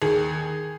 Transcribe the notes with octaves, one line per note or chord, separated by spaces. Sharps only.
D#2 G#4